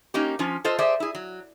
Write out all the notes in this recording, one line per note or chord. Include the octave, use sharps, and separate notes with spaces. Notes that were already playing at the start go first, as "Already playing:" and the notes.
A#3 C#4 D#4 G4
F3 C#4 F4
F4 A4 C5 D#5
G#4 C5 D5 E5
E4 G#4
F#3